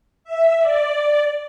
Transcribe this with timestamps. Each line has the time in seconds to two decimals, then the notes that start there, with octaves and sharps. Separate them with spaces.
0.24 E5
0.60 D5